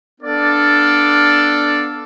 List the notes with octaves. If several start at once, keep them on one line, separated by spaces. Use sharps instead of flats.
B3 D4 A4 D5 F5